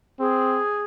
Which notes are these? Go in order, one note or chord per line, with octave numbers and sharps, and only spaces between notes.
C4 G#4